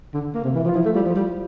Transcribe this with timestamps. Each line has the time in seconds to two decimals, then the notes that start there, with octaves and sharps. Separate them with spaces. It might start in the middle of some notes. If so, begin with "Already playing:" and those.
0.14 D3
0.35 A#3
0.44 C3
0.55 E3
0.65 F3
0.69 F4
0.75 F3 E4
0.86 A3
0.96 G3 F4
1.06 F3
1.16 G3